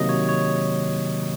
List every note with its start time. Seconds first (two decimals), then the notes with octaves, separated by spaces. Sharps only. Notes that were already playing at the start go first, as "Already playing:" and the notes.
Already playing: C3 D#3 F#3 A#3 D#5
0.09 C#5
0.29 C#5